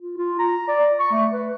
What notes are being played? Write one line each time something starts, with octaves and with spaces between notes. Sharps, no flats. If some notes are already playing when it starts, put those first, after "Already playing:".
F4
F4
A#5
D5
C#6
A3
B4